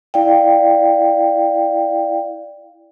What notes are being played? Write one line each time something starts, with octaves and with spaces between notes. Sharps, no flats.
E4 D5 F5 G5